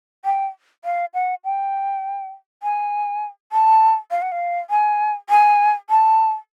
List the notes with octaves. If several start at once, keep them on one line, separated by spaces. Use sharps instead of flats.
G5
F5
F#5
G5
G#5
A5
F5
F#5
F5
G#5
G#5
A5